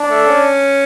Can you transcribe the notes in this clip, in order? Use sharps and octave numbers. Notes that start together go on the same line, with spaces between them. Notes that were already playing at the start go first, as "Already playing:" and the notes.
Already playing: D4
A3
C#4